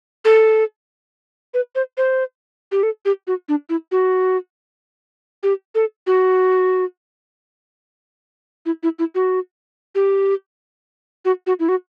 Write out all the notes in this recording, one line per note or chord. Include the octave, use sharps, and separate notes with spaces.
A4
B4
C5
C5
G4
A4
G4
F#4
D4
E4
F#4
G4
A4
F#4
E4
E4
E4
F#4
G4
F#4
F#4
E4
F#4